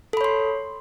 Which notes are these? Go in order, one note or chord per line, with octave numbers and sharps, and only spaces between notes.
A4 C#5 B5 C6